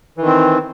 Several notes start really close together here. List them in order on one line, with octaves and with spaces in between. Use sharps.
E3 D#3 C4